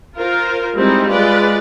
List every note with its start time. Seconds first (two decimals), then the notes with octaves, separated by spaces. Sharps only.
0.18 F4 A#4 C5
0.76 G3 G#3 C4 D#4 E4
1.10 G#3 F4 B4 D5